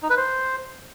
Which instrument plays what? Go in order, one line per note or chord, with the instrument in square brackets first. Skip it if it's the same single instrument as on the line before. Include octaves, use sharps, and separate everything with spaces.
[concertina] D#4
B4
C5